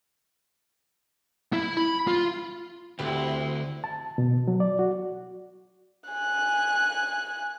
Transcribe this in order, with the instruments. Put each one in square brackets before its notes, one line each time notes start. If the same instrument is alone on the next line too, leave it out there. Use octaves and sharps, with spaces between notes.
[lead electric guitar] E4
B5
F4
[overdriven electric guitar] D2 [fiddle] C4 E4 [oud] G4 B4
[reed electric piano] A5
B2
F#3
D5
F#4
[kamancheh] G#5 F#6